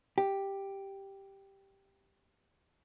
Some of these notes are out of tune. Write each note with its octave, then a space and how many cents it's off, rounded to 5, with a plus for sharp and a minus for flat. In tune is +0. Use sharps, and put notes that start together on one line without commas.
G4 +0